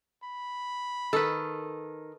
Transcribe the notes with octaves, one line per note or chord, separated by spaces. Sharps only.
B5
D#3 A4 B4